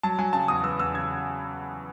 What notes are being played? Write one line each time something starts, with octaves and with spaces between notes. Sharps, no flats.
F#3 A5
F#3 G#5
C#3 A5
E2 D#6
B3 E6
E2 E6
C#3 G#6